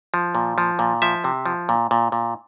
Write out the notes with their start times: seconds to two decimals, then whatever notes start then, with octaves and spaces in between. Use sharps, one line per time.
0.14 F3
0.35 A#2
0.58 F3
0.79 A#2
1.02 F3 E5
1.24 C3
1.46 F3
1.69 A#2
1.91 A#2
2.12 A#2